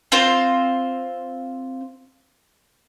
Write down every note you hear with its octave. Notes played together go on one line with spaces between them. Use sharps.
C4 F4 C5